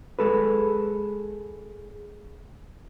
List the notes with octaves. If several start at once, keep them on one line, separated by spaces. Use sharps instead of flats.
G#3 A4 B4